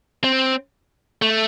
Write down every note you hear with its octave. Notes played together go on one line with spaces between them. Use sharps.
C4
A3